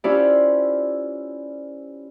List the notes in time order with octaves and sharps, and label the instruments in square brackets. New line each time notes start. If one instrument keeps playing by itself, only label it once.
[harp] C#4 E4 F4 G4 C5 D5